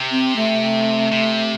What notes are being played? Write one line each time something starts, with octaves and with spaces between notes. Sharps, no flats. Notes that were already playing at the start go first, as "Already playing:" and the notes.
Already playing: C3
C4
A3
C3